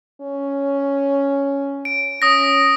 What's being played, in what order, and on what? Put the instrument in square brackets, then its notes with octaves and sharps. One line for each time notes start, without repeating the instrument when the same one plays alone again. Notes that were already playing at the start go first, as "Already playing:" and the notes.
[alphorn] C#4
[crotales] D7
[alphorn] C#4 [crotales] D#6 A#6